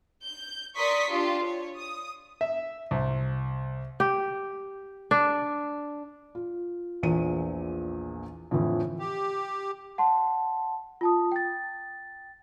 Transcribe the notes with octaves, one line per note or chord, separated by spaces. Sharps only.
G6
A#4 D5 C6 C#6 D#6 B6
D4 F4 G4
C#5
D#6
E5
C2
G4
D4
F4
A#1 E2 A#2 F3 D#7
F2 A2 D3 E3 F3
G4
F#5 A5 C6
F4 A5 D#6
G5 A6